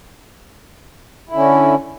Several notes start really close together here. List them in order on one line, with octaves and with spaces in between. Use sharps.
E4 D3 C#4